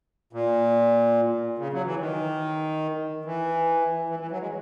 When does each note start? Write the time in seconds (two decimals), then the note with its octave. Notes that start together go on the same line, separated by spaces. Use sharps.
0.33 A#2
1.58 C#3
1.73 F#3
1.85 E3
1.99 D#3
3.25 E3
4.09 E3
4.19 E3
4.31 F#3
4.40 G#3